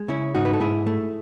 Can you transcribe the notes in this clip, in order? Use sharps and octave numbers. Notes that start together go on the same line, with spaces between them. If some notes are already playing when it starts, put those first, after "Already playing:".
Already playing: G#3
C#3 C#4 E4
G#2 D#4 F#4
B4
A4
G#2 E4 G#4
A3